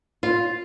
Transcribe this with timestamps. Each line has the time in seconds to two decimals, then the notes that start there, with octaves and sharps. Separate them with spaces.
0.23 F4